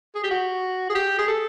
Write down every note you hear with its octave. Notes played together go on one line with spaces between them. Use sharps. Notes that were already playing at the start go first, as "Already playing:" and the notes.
G#4
G4
F#4
G#4
G4
G#4
A4